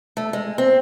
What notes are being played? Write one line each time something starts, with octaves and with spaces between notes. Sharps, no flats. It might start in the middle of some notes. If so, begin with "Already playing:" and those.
A3
G#3
C4